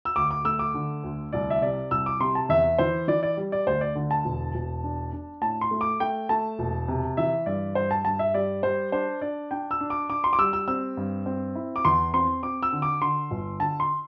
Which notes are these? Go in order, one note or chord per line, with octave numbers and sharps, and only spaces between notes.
E6
D2 D6
D6
A3 E6
D6
D3
D2
C2 D5
E5
C3 D5
C2 E6
D6
C3 C6
A5
E2 E5
E3 C5
E3 D5
D5
G3
D5
D2 C5
D5
D3
A5
E1
E1
D4
D4
A2 A5
C6
A3
D6
A3 G5
A3 A5
E1
C3
E3 E5
G2 D5
G2 C5
A5
G2 A5
E5
G3 D5
G3 C5
D4 C5
D4 D5
D4 G5
E6
D4
D6
D4 D6
C6
D6
G3 E6
E6
C4 E6
G2
C4
E4
D6
E2 C6
C4 C6
C4 D6
E6
D3
D6
D3 C6
G1
D3 A5
C6